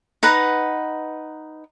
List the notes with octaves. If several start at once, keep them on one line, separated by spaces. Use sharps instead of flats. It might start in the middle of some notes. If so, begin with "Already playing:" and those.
D#4 B4 F#5 A#5